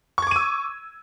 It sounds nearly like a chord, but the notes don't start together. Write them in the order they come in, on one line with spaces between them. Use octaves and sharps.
C#6 G#6 D6 D#7 E6